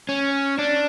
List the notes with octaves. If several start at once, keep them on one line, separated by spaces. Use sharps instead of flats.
C#4
D4